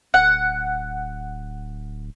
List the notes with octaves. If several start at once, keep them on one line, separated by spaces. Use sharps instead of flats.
D1 F#5